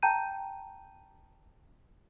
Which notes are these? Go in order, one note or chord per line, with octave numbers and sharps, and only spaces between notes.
G5 A5 A#5 G6 D#7